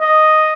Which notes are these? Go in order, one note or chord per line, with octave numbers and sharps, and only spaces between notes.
D#5